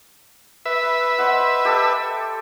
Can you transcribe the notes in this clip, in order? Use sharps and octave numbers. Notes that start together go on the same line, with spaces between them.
B4 E5
C5 D#5 F#5
G4 A4